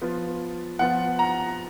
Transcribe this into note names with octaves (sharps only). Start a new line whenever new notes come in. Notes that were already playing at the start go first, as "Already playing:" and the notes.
F3 B3 F4
F3 B3 F4 F#5
A#5